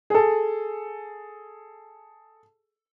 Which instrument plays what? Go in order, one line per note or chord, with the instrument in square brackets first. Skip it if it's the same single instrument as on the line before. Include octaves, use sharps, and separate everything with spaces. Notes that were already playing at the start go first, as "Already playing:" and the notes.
[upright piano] G#4 A4